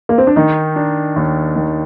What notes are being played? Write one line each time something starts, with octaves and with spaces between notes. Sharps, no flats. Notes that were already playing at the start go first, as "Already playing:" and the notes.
A#3
C4
D4
D#3 D#4
D4
D#2
D#3